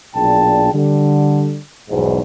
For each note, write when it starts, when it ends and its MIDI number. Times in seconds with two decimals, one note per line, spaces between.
0.15 0.71 35
0.15 0.71 46
0.15 0.71 62
0.15 0.71 68
0.15 0.71 79
0.15 0.71 81
0.73 1.59 50
0.73 1.59 55
1.90 2.20 35
1.90 2.20 40
1.90 2.20 44